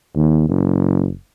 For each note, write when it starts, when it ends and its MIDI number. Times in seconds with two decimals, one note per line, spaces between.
0.16 0.47 39
0.49 1.10 30